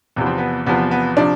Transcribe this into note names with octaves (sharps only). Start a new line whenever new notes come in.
E2 C3 F3 B3
C4
B3
E2 C3 F3 B3
B3
C3 F3 D4